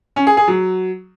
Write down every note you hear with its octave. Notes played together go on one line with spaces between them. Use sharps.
C#4
G#4
G#4
F#3